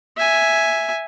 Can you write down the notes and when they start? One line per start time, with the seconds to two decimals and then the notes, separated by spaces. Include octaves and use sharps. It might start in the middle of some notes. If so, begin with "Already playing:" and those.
0.17 E5 G#5